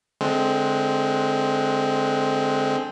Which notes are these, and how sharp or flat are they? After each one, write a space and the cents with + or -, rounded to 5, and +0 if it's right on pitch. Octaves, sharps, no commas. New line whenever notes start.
D3 +0 G#3 +20 C4 +0